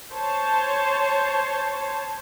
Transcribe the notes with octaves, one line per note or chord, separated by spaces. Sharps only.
C5 C#5 A5